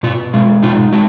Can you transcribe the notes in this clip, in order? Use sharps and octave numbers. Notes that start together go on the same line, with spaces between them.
B2 F4
G#3 F4
D#4 F4
G#3 F#4